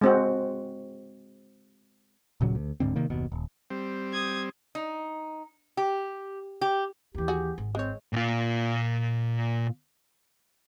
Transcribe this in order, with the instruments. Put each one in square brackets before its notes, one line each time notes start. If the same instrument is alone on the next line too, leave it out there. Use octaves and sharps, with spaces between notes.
[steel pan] G#3 C4 F#4
[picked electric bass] D#1 A#2 C#3 F#3
D2
D1 G#2 D3 C4
C3 D#3 A#3
F#1 D#2 B2
D#1
[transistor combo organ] G3 C4
[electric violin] D#6 G#6
[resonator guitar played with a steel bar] D#4
G4
G4
[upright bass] D#2 E3 [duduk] G4
[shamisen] F#4 G#4
[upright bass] G#1
[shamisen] G#3 C#5 [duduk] C4
[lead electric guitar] A#2 F4